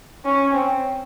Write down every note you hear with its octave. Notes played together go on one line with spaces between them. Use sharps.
C#4
C4